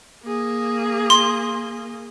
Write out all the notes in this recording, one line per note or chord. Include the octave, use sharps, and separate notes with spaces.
A#3 G#4
C6